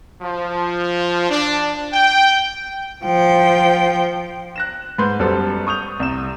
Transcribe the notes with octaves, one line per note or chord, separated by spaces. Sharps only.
F3
D4
G5
F3 G5
F#6 A#6 E7
G#2 B4 C6 G6
F#2 G3 B3 A4 C5
C#6 D#6 G6 F7
C2 E7